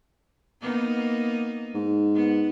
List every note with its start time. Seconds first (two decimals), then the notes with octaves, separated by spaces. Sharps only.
0.61 A#3 B3 D#4
1.74 G#2
2.14 B3